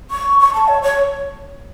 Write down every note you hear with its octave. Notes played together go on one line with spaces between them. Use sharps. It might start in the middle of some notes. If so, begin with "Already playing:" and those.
C#6
C#6
A5
C#5
C#5